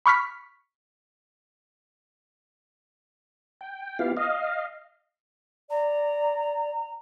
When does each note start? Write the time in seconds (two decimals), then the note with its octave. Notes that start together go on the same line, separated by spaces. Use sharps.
0.06 B5 C#6 F6 B6
3.61 G5
3.99 B3 E4 F4 G4 F5
4.17 D#5 F5
5.70 D5 A#5